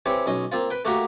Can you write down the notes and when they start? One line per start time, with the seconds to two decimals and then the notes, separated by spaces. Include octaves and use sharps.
0.06 E3 C4 G4 C#5
0.26 B1 C#4 D#5
0.52 A#3 C4 F4
0.70 B4 G5
0.85 A3 A#3 F#4 G4 A#4